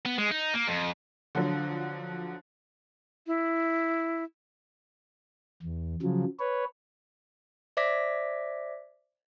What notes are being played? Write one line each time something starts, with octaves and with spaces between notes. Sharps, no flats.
B3
G#3
D#4
A#3
F2
D3 F3 F#3
E4
E2
C#3 F3 F#3
B4 C#5
C5 D5 E5 D6 A#6 B6